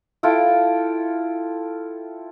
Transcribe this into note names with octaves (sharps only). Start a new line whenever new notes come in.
E4 F4 A4 G5